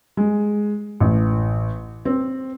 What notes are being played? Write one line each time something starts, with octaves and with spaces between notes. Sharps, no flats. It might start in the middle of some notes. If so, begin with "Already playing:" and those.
G#3
A1
C4